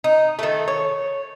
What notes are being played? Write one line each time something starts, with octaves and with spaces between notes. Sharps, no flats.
D#4
D#3 A3
C#5